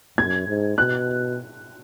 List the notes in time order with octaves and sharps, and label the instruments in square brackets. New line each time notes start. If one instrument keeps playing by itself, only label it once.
[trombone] F#2 [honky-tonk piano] G#6
[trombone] G#2
[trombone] B2 [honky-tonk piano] F#6